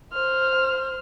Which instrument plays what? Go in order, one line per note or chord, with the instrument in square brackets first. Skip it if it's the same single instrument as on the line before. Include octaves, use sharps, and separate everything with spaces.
[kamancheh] C5 F6